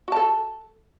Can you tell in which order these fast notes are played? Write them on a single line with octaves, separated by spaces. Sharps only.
F#4 A5 A4